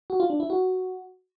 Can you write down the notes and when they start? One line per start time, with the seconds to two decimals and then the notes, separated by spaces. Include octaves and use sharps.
0.10 F#4
0.20 F4
0.30 D4
0.40 E4
0.50 F#4